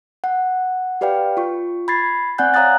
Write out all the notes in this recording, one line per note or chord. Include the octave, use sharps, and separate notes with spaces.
F#5
G4 B4 D5 F5 G5
F4 C#6
B5 G#6 A6 C7
C4 D5 F#5 G#5 F#6 G6
C#5 F5 A#5 D#6 F#6 A6